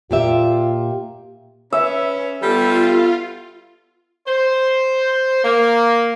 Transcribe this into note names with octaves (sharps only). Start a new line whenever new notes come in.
A#2 F4 G4 E5
C#4 B4 E5
G3 B3 F4 A4
C5
A#3